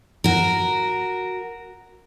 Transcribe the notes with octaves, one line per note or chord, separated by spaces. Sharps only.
F#4 A#4